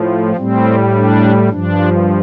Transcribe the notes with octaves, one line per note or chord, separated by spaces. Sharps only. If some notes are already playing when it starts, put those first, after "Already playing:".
Already playing: A2 F3
A2 G3 C4
D4
G2 F3 D4